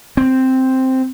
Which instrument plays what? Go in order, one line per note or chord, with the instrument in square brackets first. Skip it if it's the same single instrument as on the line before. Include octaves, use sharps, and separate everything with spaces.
[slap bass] C4